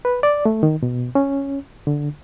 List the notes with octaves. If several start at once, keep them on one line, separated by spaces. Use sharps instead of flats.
B4
D5
A3
D#3
B2
C#4
D3